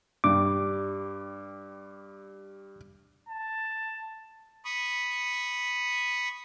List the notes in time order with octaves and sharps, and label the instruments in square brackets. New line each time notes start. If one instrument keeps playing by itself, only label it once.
[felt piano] G2 G3 [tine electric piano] D6
[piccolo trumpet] A5
[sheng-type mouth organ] B5 C#6 D#6